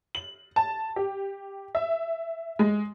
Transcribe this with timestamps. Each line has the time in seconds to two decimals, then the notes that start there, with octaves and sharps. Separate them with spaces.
0.15 F#7
0.56 A5
0.96 G4
1.75 E5
2.59 G#3